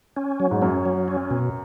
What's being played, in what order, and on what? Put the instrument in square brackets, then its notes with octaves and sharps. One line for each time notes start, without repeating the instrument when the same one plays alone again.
[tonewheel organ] C#4
F#3
[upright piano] G#2
[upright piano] F#2 [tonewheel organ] C#4
[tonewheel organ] F#3
C#4
B2